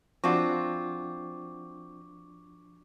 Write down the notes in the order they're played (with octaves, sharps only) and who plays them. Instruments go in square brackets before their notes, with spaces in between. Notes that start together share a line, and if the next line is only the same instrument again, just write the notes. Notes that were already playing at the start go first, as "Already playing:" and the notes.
[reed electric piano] F3 D4 F#4 [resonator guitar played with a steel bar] C4 F4 [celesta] C#6 D6